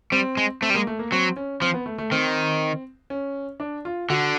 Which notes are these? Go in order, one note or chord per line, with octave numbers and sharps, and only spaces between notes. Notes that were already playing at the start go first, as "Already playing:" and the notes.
G3 C4
G#3
A3 C4
G3
G#3 A#3
A3
A#3
F#3 C4
C#4
F3 C4
B3
A3
A3
D#3 C4
C#4
D4
F4
D3 F#4